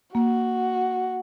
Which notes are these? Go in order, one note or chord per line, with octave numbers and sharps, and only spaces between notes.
A#3 F#4